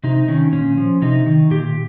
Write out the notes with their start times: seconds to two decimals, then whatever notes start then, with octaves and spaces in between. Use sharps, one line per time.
0.04 C3 D#4
0.28 D#3 C#4
0.53 A#2 C#4
0.77 F3
1.02 C3 D#4
1.26 D#3
1.51 A#2 G4